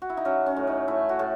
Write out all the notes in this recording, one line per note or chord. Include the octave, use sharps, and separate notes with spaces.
F#4
E4
D#4
F#3 C#4
C#4
A2
D#4
A3 E4
F#4
A2 A4